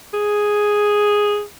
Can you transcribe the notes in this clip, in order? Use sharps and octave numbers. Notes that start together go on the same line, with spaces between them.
G#4